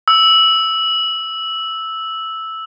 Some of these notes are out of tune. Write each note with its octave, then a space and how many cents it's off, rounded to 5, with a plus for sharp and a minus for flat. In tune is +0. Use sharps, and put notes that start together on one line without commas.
E6 -5